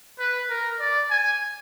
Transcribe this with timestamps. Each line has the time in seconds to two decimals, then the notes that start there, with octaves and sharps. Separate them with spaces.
0.19 B4
0.50 A#4
0.80 D5
1.11 G#5